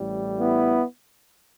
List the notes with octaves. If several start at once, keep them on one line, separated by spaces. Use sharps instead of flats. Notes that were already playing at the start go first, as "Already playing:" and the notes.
Already playing: A1 A2 G3
B3 E4